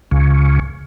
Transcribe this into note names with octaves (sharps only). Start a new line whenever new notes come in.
C#2 C#3